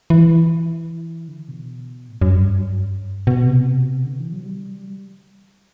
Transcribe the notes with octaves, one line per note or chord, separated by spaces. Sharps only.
E3
D3
B2
A2
F#2
G2
B2
C3
D3
E3
F#3
G3